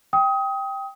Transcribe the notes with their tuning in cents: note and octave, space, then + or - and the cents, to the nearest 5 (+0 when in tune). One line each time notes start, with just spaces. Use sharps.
G5 +0 D#6 +25